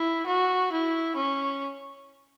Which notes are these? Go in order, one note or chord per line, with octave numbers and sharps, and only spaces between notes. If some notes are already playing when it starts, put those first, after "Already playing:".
Already playing: E4
F#4
E4
C#4